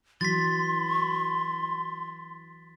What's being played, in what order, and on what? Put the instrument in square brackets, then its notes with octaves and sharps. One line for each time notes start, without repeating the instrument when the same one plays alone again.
[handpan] E3 F#3 [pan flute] C6 [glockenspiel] A6 B6